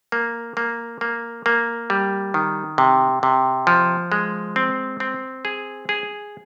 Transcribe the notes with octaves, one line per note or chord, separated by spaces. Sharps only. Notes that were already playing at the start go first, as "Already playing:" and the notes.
A#3
A#3
A#3
A#3
G3
D#3
C3
C3
F3
G#3
C4
C4
G#4
G#4